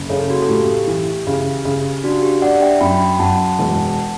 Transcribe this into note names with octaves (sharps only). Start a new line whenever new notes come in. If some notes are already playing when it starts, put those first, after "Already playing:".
Already playing: F#1
C#3 A4 C#5
F#4
A4
A2 G4
E3
C#3
C#3
D4 F#4
G4
D4 D5 F#5
E5 G5
F#2 G5 B5
F#2 F#5 A5
E1